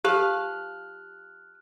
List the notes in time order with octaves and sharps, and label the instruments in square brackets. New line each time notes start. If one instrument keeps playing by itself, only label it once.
[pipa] F3 B4 F5 [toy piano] G4 [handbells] F6 F#6